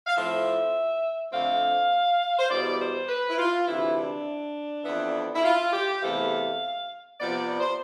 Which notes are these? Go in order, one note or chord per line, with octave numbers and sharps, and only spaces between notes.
F5
A2 F3 C4 E5
F2 D3 A3 C4 F5
C5
E2 B2 G3 D5
C5
B4
E4
F4
D2 C3 E3 E4
D4
F2 E3 B3
E4
F4
G4
E2 C3 E3 A3 C4 F5
C3 F3 B3 D5
D5
C5